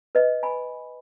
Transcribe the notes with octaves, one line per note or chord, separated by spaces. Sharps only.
B4 D#5
G#5 B5